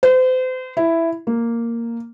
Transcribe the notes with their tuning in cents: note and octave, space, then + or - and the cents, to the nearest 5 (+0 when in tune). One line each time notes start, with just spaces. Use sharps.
C5 -35
E4 +5
A#3 -5